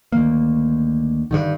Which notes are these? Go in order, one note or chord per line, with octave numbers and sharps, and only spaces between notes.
D2 D#3 A#3
G2 D3 D#3